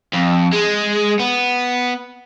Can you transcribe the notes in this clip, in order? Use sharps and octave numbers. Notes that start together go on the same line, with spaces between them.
F2
G#3
B3